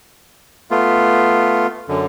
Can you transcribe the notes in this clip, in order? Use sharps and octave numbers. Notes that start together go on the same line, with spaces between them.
A3 B3 F4
F#2 D3